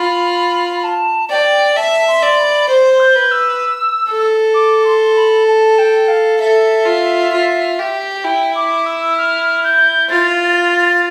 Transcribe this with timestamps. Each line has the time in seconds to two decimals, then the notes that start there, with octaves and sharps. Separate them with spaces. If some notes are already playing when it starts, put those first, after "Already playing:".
Already playing: F4 B5
0.77 B5
0.84 A5
1.30 D5 G5
1.76 E5 A5
2.08 C6
2.23 D5
2.39 B5
2.69 C5 C6
3.00 G6
3.15 B4
3.31 E6
4.09 A4
4.54 D6
4.85 C6
5.16 B5
5.48 A5
5.78 G5
6.08 F5
6.39 A4 E5
6.86 F4
7.32 F4
7.79 G4
8.24 E4 G5
8.55 D6
8.86 E6
9.18 F6
9.64 G6
10.09 F4 A6
10.41 A6
10.72 A6